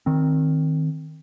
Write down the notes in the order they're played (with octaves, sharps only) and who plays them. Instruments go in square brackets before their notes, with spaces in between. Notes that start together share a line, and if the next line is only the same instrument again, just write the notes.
[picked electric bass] D#3 C4